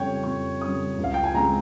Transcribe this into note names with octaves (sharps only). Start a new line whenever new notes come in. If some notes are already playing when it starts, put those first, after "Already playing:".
Already playing: F2 C#3 G3 C4 C#5 G5
F2 C#6
C#3 G3 C4 D#6
C#2
F5
G5
G#5
C#3 G#3 C4 A#5